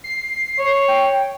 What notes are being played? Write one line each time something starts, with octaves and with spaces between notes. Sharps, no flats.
C7
C#5
G5